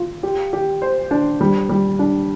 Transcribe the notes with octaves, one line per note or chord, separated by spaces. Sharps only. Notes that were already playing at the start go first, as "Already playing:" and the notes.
Already playing: F4
G4
G4
C5
D4
G3
G3
D4